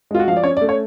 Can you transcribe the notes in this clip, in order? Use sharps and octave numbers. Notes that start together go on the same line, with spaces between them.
G#3 F4
F#4
F3 F5
D5
C#4 C#5
D5
A3
C#5